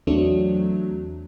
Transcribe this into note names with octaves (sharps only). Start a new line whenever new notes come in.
E2 F#3 A3 C4 D4